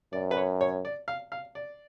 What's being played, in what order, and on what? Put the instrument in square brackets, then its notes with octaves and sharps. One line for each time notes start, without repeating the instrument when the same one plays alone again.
[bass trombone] F#2 [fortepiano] D5
[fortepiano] B4
C#5
C#5
D5
F5
F5
D5